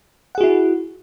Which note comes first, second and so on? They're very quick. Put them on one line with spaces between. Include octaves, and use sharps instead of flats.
F#5 G#4 F#4 E4